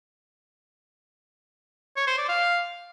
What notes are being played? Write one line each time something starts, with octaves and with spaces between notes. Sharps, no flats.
C#5
C5
D5
F5